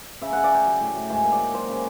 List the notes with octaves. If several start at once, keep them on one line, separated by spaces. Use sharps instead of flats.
C#3 E5
C#3 F#5
D5
C#3 G5
F#3
A2
F#3
G#2 G#5
A#3
D5
G#2
F#3 C5
C#3